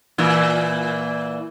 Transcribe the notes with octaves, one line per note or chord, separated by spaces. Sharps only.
A#2 E3